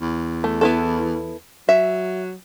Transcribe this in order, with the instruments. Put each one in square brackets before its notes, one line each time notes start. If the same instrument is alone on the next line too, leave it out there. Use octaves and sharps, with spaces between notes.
[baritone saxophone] E2
[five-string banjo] A3
B3 E4 A4
[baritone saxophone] F#3 [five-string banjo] E5